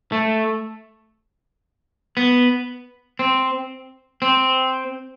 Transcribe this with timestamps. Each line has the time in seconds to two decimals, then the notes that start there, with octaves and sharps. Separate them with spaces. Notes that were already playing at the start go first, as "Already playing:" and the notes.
0.12 A3
2.17 B3
3.19 C4
4.22 C4